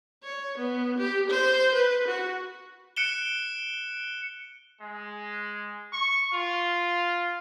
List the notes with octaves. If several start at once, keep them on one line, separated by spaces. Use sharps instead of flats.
C#5
B3
G4
C5
B4
F#4
F#6 C#7 D7 E7 G7
G#3
C#6
F4